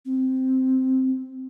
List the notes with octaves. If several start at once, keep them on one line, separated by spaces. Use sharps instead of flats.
C4